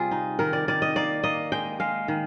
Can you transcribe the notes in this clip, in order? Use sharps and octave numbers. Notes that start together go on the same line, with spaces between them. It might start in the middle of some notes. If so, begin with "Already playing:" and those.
Already playing: C3 G3 C4 F4 G#4
D#4
D#3 A#4
D5
D#3 D5
D#5
A#3 D5
A#3 D#5
G#3 G5
G#3 F5
D#3